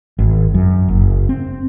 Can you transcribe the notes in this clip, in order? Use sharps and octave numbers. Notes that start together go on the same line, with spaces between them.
G#1
F#2
F#1
C4